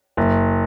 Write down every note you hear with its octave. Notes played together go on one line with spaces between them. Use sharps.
F#1